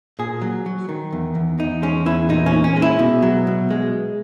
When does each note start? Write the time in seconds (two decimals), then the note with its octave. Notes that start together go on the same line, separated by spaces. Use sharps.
0.19 A#2 G#4
0.42 F#3
0.66 F#3
0.89 D#3
1.13 E2
1.35 E2
1.59 E2 D#4
1.82 G#3 C#4
2.06 E2 E4
2.29 A#2 D#4
2.46 C#4
2.53 A#2
2.64 C#4
2.76 G#3
2.82 E4
2.99 B2
3.22 F#3
3.47 B2
3.70 G#3